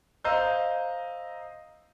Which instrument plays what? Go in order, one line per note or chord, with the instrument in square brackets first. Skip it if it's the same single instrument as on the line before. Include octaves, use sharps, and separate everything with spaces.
[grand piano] C5 D#5 F5 A#5 E6 G6